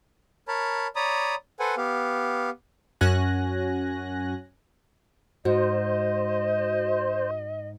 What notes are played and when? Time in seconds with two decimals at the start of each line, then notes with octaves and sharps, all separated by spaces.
0.48 A#4 C#5 A5 B5
0.96 C#5 D5 A#5 B5 D#6
1.60 A4 B4 C5 F#5 G#5
1.77 B3 G4 F5
3.01 F#2 C#4 F#4 G#5 F#6 A#6
5.45 G#2 F#4 C5 D#5